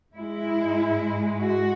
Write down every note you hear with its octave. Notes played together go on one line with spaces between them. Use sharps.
G#2 G#3 E4
F#4